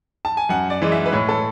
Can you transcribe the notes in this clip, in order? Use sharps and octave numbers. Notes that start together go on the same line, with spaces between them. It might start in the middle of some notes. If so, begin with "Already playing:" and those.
A5
G#5
F#2 F#5
D5
E3 G#3
E5
B4
A2 C#5
A4